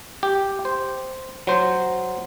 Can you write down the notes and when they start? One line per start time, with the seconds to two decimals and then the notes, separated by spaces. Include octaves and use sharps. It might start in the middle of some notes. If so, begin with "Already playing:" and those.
0.23 G4
0.65 C5
1.47 F#3 C5